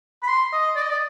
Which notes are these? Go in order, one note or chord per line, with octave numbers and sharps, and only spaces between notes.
B5
C6
D#5
D5
D#5
D5